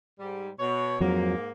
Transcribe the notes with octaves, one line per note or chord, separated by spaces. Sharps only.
G#2 G3
B2 C#5
F2 G#2 F#3 A#3